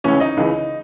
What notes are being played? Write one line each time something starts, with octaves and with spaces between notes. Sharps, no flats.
C#2 C#3 E3 C#4 C#5
D#4 D#5
C#2 C#3 E3